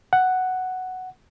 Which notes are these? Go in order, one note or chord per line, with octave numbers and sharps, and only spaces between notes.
F#5